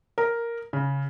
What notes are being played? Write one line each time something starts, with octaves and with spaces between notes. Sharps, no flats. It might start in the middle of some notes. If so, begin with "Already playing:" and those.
A#4
C#3